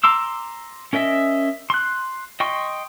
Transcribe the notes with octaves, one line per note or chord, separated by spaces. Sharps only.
A#5 C6 D6 E6
C#4 A#4 D#5 E5
C6 F#6
D#5 G5 C6 C#6